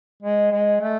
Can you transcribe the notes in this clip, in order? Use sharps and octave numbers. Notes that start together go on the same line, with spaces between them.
G#3
G#3
A3